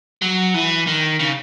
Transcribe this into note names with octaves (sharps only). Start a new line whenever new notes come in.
F#3
E3
D#3
C#3